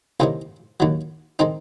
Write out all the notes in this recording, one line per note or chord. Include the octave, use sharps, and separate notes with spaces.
C2 C3 D#3 G#3 A#3 C#4
D#2 D#3 F#3
D#3 G#3 C4 D#4